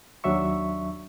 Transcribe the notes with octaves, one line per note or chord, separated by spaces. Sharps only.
D#2 F#3 D4 E5 C#6